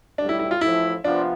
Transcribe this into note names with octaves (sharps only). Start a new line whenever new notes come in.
B1 A2 G3 D4
E4
E4
F4
A1 A2 F3 E4
C3 F3 B3 D4 F4